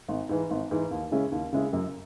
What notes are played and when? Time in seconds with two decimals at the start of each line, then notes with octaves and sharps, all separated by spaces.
0.09 G#1
0.29 G#2 E3
0.51 G#1
0.71 G#2 E3
0.91 D#2
1.11 C#3 G#3 C#4 E4
1.32 D#2
1.53 C#3 G#3 C#4 E4
1.73 F#2